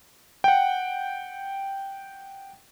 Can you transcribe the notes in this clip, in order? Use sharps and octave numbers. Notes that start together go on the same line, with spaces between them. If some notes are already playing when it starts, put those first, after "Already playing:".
F#5 G5